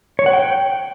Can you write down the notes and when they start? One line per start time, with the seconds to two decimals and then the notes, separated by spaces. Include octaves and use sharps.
0.19 C#5
0.26 F#5
0.33 G5